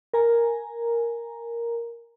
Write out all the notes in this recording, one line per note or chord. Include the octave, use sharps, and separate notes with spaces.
A#4 G#5 A#5